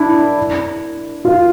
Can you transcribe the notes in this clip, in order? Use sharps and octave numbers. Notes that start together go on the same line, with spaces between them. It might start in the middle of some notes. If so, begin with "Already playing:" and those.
Already playing: D4 E4
F4